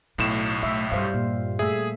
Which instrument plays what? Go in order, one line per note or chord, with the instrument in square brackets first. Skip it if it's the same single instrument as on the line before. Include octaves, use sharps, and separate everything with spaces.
[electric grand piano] B1 A2 E7 [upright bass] A3
[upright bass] A3 [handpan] E5
[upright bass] G2 [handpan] G3 C5 F5
[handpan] A#2
[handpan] A3 E5 [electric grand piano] G#4